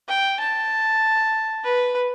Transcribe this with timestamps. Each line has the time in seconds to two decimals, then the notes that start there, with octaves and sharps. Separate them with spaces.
0.09 G5
0.40 A5
1.64 B4